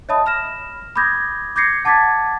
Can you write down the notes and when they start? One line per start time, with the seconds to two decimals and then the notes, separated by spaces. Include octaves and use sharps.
0.09 C#5 D#5 E5 A5 B5 D#6
0.26 B5 F6 A#6 E7
0.96 B5 D6 D#6 G6 G#6 A#6
1.56 D6 G6 G#6 A#6 C7 C#7
1.85 F#5 A5 D6 G#6 A6 B6